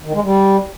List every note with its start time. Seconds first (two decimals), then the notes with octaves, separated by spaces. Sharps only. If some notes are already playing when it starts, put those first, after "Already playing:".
0.05 D#3
0.14 G#3
0.23 G3